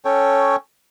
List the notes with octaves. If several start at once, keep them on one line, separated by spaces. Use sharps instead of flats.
C#4 A4 C#5 G5